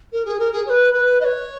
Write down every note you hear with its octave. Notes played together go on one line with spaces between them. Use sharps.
A#4
G#4
A#4
G#4
C#5
B4
B4
D#5
C#5